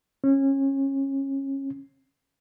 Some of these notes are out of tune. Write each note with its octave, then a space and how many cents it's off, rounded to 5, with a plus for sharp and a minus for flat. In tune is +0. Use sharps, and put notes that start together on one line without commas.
C#4 -25